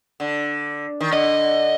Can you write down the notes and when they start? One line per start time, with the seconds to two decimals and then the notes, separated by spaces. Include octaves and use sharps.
0.20 D3
1.01 D#3
1.12 D3 D#5